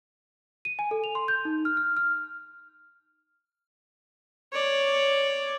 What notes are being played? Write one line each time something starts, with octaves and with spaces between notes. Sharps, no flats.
D#7
G#5
A4
F7
C6
G6
D#4
F6
F6
F6
C#5 D5